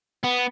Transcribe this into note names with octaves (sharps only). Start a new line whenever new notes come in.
B3